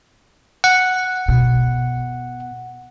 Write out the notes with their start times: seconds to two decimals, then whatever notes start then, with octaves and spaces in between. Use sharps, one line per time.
0.64 F#5
1.28 B2